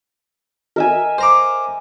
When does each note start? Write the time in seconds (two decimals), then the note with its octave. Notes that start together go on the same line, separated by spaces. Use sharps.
0.76 A#4 E5 G#5
1.18 C5 A#5 D6